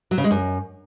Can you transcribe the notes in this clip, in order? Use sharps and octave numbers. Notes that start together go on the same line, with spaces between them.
F#3
C#3
G#3
F#2